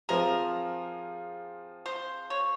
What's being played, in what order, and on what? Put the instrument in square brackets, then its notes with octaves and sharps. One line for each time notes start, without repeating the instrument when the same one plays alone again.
[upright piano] F3 C4 F4 G#4 [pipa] A#4
[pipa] C5
C#5